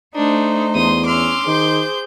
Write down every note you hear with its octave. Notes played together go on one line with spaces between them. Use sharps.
A3 D4 D#4 C5
E2 C6 D#6
C#4 C6 D6 E6 F6
D#3 G#4 C5 G6